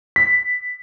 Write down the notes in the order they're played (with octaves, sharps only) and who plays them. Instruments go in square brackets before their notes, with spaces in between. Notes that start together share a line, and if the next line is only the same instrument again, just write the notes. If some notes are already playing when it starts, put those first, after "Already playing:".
[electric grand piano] B6